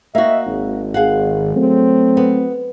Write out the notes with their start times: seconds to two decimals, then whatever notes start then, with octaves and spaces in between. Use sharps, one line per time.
0.15 A#3 F#4 D#5 E5
0.46 G#1
0.94 G#4 F5 F#5
1.56 F#3 A3 C4
2.17 B3